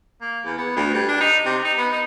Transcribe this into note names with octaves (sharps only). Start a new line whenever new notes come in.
A#3
E2
B3
D2
G2
D4
D#4
C3
D#4
B3
D#4